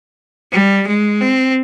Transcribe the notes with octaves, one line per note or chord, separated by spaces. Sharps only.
G3
G#3
C4